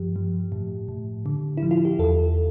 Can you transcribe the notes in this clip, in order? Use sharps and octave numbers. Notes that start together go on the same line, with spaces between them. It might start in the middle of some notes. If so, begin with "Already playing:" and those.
Already playing: G2 F3 G4
F3
A2
A2
D3
F3 E4
F4
G4
E2 A4